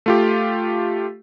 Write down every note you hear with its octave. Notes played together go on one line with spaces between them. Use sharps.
A3 F4 G4